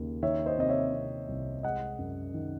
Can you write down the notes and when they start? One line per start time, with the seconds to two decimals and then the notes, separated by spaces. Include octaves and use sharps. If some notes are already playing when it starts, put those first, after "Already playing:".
Already playing: D#2 C#3
0.23 D#3 C#5 E5
0.46 C5 D#5
0.58 C3 D#5
0.69 C#5 E5
0.94 C3
1.29 C2
1.63 G#3 D#5 F#5
1.99 F#2
2.34 D#3